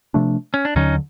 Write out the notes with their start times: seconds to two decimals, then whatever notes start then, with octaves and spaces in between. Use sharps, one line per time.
0.14 C3 F3 A3 D4
0.54 C#4
0.65 D4
0.76 D#2 D3 F#3 C#4 D#4